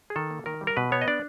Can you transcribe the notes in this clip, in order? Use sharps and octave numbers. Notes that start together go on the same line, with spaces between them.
G#4
D#3 A4
A#3
D#3 A#4
G3
A#4
B2 B4
B3 C#5
D#5
D4 D5